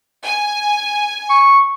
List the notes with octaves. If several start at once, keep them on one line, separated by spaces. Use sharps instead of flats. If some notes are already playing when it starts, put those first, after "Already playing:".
G#5
C#6